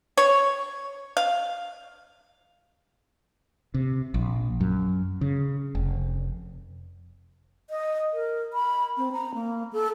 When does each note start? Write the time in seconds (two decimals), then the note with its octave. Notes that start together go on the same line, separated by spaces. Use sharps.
0.18 C#5
1.17 F5
3.74 C3
4.14 A#1
4.60 F#2
5.21 C#3
5.75 F1
7.70 D#5
8.14 A#4
8.53 B5
8.97 C4
9.13 A#5
9.35 A#3
9.73 A4